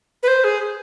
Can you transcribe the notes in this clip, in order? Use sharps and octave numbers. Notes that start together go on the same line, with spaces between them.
B4
C5
G#4